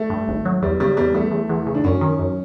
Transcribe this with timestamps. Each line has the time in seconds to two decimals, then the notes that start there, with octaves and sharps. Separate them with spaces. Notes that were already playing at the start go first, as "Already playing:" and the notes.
Already playing: A3
0.10 G2
0.28 G#1
0.45 F#3
0.62 E2 G3
0.80 C#3 G3
0.97 E2 G3
1.14 E2 A3
1.31 E2
1.49 E2
1.67 C#3
1.75 D4
1.84 F#2 C#4
2.01 D#3
2.19 F#2